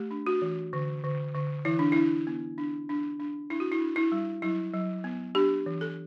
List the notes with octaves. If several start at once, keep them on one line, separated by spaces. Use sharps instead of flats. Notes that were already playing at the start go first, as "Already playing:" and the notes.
Already playing: A3 G4
D4
F#4
E3
D3
D3
D3
E3 E4
D4
D4 E4
B3
D4
D4
D4
D4 E4
F#4
E4
D4
E4
G3
F#3 E4
F#3
B3
D4 G4
E3
A4